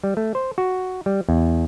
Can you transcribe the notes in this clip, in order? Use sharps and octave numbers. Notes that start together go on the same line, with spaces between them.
G3
A3
C5
F#4
G3
E2